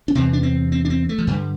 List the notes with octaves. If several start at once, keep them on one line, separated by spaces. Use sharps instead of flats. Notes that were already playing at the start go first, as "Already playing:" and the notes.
D4
E2 C3 C4
D4
C4
C4
D4
C4
A3
F3
G2 D3 G3